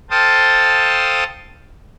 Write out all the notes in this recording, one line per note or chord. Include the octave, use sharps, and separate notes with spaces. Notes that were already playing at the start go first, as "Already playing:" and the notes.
A4 C5 F5 G5 A5 D#6